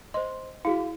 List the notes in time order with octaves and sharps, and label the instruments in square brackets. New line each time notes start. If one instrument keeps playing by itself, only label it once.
[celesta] C5 C6 [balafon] D#5
[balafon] E4 [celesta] F#4 G#4 F5